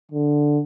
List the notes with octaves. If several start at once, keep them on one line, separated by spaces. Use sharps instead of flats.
D3